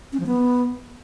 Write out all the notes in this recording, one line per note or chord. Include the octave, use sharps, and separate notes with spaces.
C#4
F3
B3